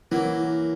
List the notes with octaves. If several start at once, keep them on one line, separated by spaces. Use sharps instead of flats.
E3 F#3 A#3